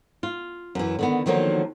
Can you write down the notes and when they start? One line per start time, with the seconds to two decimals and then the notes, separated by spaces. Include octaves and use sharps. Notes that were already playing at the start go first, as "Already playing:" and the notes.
0.23 F4
0.75 F#2 E3
0.99 D3 D#3 B3
1.26 D3 D#3 F3 F#3 A#3 D#4